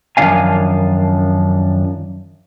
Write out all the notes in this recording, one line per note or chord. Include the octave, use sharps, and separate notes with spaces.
F#2 D#3 F3 D4 F5 G#5